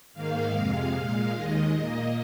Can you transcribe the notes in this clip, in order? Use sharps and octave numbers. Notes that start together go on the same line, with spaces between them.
G#2 D#3 A#3 F5
F2 C3 G#3
A#2 G#3
D#2 D#3 G#3 D#5
A#2 A#3